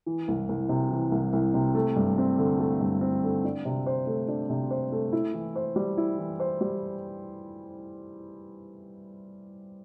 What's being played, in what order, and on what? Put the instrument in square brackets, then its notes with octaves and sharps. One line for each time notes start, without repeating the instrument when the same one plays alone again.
[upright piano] E3
C2
C2
C3
E3
C2
C2
C3
A3
G2
C4
D3
A3
G2
C4
D3
D4
C3
C5
A3
D4
C3
C5
A3
E4
E3
C5
G3
E4
E3
C5
G3